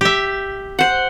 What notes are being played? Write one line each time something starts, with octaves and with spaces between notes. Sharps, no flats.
G4 E5
C5 F#5